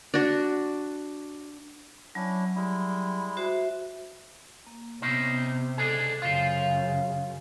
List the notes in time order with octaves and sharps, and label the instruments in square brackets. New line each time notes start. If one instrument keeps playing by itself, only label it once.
[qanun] D4 F#4
[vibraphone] F#3 [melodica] C#4 D4 E4
[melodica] G3 G#3 E4
[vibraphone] F#4 C5 E5
A#3
[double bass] C3 [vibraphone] B3 E6 [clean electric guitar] C#4 D#4 C5
[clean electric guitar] C#2 D4 G#4 [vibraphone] A4 D#5
[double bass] F#2 C#3 [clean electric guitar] F4 C5 [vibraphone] F5